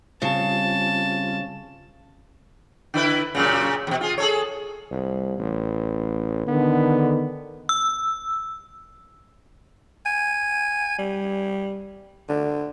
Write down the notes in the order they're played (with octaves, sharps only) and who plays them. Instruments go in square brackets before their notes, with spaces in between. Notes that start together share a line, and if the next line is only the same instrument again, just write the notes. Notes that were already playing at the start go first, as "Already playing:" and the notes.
[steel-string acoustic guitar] C#3 [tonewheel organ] G3 C4 F4 [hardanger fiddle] A5
[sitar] D3 E4 B4
F#2 A#2 C#3
E2 B2
F4 G#4
G#4 A4 C#5
[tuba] C2
A1
[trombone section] D3 D#3 [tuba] B3
[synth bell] E6
[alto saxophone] G#5
G3
D3